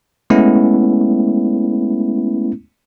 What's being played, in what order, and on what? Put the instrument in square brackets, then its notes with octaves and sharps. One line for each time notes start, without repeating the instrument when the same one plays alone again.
[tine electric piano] G#3 A3 B3 C#4 E4